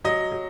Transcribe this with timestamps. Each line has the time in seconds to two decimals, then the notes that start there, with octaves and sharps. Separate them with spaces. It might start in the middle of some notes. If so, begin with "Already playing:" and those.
0.04 F#3 D#5
0.32 F#3